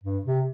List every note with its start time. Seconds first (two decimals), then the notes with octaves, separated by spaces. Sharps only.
0.04 G2
0.25 C3